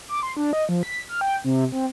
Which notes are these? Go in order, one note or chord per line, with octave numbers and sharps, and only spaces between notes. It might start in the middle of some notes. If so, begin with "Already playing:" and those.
D6
C6
D4
D#5
F3
B6
F6
G5
C3
C4